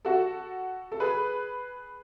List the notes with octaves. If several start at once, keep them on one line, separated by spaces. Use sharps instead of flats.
F#4 A4
A4
G#4 B4